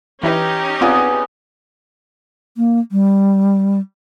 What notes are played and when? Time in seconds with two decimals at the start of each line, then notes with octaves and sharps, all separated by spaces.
0.23 E3 C#4 D#4 E4 G4 B4
0.81 B3 C4 F4 G#4 D5
2.57 A#3
2.92 G3